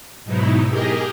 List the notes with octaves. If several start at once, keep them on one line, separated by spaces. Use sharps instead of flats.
G#2 B2 F#3 D#4 E4
G4 G#4 A#4 D#5